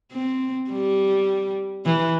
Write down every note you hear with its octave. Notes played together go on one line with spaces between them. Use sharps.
C4
G3
E3